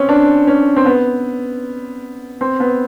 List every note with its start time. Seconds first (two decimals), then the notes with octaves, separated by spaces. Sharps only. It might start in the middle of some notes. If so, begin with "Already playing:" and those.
Already playing: C4 C#4
0.09 D4
0.47 C#4
0.76 C4
0.85 B3
2.41 C4
2.60 B3